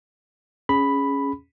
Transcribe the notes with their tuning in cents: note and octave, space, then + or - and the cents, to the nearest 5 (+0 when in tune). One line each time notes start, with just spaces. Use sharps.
C#4 +0 G#4 +0 B5 +0